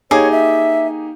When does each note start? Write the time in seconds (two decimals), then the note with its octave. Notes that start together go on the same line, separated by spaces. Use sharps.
0.11 A#3 D#4 G4 G#4 C#5 D6
0.31 E5